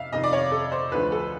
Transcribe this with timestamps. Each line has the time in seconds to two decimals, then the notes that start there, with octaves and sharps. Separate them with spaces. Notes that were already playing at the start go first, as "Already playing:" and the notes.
Already playing: F2 C3 E5 F5
0.12 F2 C3 D#3 D#5
0.24 D5
0.33 C#5
0.52 A4
0.72 C5
0.91 D2 D3 F3 A3 B4
1.12 A4